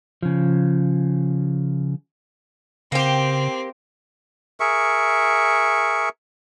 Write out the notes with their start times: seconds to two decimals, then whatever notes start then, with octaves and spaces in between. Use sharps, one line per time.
0.23 C#3 F3
2.92 C#3 A#3 C4 G4
4.60 G#4 A#4 E5 C#6